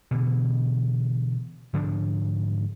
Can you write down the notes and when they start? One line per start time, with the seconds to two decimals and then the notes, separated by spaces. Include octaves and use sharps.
0.11 B2 D3 E3
1.73 G#2 D3 F3 D4